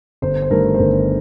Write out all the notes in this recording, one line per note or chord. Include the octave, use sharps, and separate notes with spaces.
G1 C5
C5
G2 D#3 A3 A#4
C5
G1 A#4